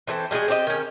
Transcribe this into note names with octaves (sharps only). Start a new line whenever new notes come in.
E3 G3 A3 C4
G3 G#3 F#4 G#4
C4 G4 D5 D#5
D#3 C#4